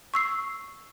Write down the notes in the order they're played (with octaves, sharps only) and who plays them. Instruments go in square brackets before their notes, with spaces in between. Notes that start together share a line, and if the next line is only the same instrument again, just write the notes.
[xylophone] C#6 E6 C7